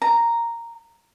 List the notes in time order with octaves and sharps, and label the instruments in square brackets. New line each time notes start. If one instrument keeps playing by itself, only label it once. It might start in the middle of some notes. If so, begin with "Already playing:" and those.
[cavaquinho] A#5